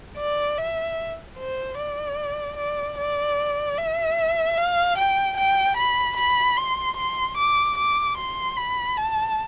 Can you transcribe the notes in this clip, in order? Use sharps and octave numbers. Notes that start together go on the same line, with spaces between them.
D5
E5
C5
D5
D5
D5
E5
F5
G5
G5
B5
B5
C6
C6
D6
D6
C6
B5
A5